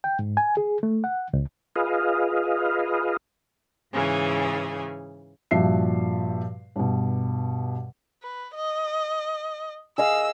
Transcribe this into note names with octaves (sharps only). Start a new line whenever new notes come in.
G5
G#2
G#5
G#4
A3
F#5
C#2
F4 G#4 B4 D#5 F5
G#2 C#3 E3 G#4
G2 A#2 F3 F#4 E5 C7
G2 B2
B4
D#5
G#4 D#5 F5 E6